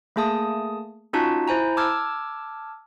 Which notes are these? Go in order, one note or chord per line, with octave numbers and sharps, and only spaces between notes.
A3 A#3 G#4 A5 D#6
C#4 D#4 F4 F#4 A5
E4 C5 G#5 A#5
A5 D6 E6 F6 G#6